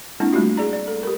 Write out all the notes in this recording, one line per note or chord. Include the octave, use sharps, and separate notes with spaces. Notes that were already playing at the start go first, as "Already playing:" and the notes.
G#3 A#3 C4 D4 E4
G3 A3 D#4 F4 F#4
G#4 D5 A#5
D5
A4
G4 A#4